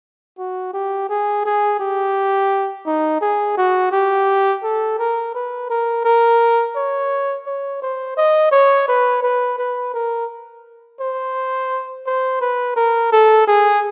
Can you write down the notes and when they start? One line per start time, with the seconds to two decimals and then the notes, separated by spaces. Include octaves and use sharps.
0.38 F#4
0.73 G4
1.09 G#4
1.45 G#4
1.80 G4
2.86 D#4
3.21 G#4
3.57 F#4
3.92 G4
4.63 A4
4.99 A#4
5.34 B4
5.70 A#4
6.05 A#4
6.76 C#5
7.46 C#5
7.82 C5
8.17 D#5
8.52 C#5
8.88 B4
9.23 B4
9.58 B4
9.94 A#4
11.00 C5
12.06 C5
12.41 B4
12.76 A#4
13.12 A4
13.47 G#4